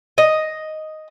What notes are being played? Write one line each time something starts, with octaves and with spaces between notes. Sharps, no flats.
D#5